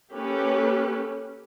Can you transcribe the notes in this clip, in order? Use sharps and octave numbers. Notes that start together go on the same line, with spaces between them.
A#3 C#4 G4 A4 B4